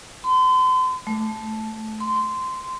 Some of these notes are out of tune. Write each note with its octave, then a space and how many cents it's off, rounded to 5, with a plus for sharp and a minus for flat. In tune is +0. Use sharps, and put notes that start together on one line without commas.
C6 -40
A3 -10
C6 -15